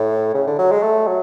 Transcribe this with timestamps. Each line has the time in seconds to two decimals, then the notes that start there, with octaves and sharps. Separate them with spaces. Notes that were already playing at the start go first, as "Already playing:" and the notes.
Already playing: A2
0.35 C#3
0.47 D3
0.58 F#3
0.72 G#3
0.83 A3
1.07 F#3